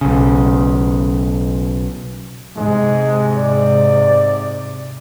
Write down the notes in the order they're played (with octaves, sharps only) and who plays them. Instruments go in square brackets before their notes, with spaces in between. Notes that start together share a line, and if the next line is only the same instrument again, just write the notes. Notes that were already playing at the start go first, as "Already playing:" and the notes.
[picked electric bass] B1 C#3
[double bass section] G#2 C3 [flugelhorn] G#3
[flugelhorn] D5